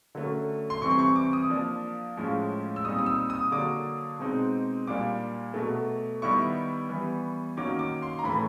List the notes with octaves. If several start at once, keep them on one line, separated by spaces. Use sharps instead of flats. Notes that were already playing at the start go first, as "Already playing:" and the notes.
D3 F#3 A3 C#4
C6
C3 E3 G3 C4 C#6
C6
C#6
D6
D#6
F3 A#3 D4
A2 F3 G#3 C#4
E6
A#2 G3 C4 D#4 D#6
D#6
E6
D#6
D3 F#3 A#3 D4 D6
B2 G#3 C4 D#4
A#2 G3 A#3 D4 D6
B2 F#3 A3
D#3 G3 B3 E4 C#6
E3 G3 B3
D#3 F#3 A#3 C#4 D6
D6
C6
A#5
A2 E3 A3 B5